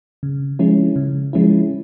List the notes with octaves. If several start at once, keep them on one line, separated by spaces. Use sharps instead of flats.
C#3
F3 G#3 C#4 E4
C#3
F3 G#3 C#4 E4